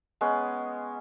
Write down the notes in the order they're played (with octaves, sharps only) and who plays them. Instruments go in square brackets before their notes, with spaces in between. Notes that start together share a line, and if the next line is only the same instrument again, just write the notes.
[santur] G#3 B3 C#4